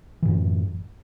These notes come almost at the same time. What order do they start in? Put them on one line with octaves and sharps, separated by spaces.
E3 A2 F#2